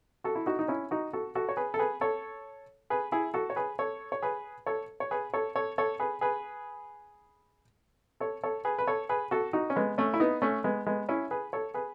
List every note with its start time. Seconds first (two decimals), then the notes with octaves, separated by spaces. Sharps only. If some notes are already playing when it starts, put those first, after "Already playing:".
0.24 F#4 A4
0.35 E4
0.46 D#4 F#4
0.59 D#4
0.68 C#4 E4
0.91 D#4 F#4
1.13 F#4 A4
1.35 F#4 A4
1.49 C#5
1.57 G#4 B4
1.74 A4
1.79 G#4 B4
2.01 A4 C#5
2.90 G#4 B4
3.12 E4 G#4
3.34 F#4 A4
3.50 C#5
3.56 G#4 B4
3.79 A4 C#5
4.12 C#5
4.22 G#4 B4
4.66 A4 C#5
5.00 C#5
5.11 G#4 B4
5.34 A4 C#5
5.56 A4 C#5
5.78 A4 C#5
6.00 G#4 B4
6.21 G#4 B4
8.20 A4 C#5
8.43 A4 C#5
8.65 G#4 B4
8.79 B4
8.87 A4 C#5
9.09 G#4 B4
9.31 F#4 A4
9.53 D#4 F#4
9.70 C#4
9.76 G#3 B3
9.98 A3 C#4
10.14 E4
10.20 B3 D#4
10.42 A3 C#4
10.64 G#3 B3
10.86 G#3 B3
11.09 C#4 E4
11.31 G#4 B4
11.53 A4 C#5
11.74 G#4 B4